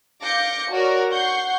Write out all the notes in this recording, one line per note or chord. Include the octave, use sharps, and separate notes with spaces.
F5 D6 G6 A#6 C#7
F#4 A#4 C#5 D5
F#5 C#6 G6 C7